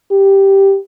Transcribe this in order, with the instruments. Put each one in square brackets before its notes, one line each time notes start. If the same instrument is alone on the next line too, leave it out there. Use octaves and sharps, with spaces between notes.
[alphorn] G4